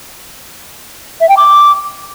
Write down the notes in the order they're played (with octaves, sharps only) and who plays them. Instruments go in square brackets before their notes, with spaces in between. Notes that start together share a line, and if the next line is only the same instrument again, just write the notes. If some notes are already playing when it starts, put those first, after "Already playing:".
[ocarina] E5
G5
D6